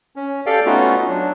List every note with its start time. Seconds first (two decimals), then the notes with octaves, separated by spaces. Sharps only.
0.16 C#4
0.46 G4 A4 D5 F5 G5
0.66 A3 B3 C#4 D#4 F4 F#4
1.08 F#3 D4